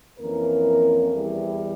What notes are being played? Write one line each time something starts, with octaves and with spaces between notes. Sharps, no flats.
F2 E3 A#3 C#4 A#4
E2 E3 G3